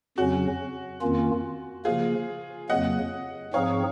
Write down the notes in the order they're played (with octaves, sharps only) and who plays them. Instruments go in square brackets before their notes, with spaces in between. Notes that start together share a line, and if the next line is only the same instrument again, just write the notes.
[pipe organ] F2 C#3 F#3 C#4 [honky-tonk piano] F#4
[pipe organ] F2 D#3 A#3 C#4 F4
[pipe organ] C#3 F3 A#3 [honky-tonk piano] F4 G#4
[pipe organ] F2 C#3 F#3 A#3 [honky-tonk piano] D#5 F#5
[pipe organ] G#2 F3 C4 D#4 G#4 [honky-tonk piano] C#5 F5